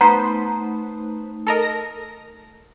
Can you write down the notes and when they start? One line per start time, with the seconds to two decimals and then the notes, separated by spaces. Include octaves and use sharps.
0.01 A3 B3 D#4 B4 C5 A#5
1.47 A4 A#4 D#5
1.62 A#6